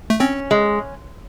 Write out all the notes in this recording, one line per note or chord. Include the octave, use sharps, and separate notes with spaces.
A3
C4 C#4
G#3